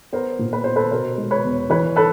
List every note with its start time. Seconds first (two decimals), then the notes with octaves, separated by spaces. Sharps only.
0.13 B3 A#4 C5
0.39 A#2
0.53 B4
0.64 B3 C5
0.76 A4 B4
0.91 B2 A#4 C5
1.18 G#3
1.31 B4 C#5
1.44 E2
1.70 E3 B4 C#5
1.96 A4 B4